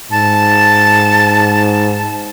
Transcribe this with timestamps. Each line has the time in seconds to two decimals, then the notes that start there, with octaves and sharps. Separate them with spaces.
0.11 G#2 A5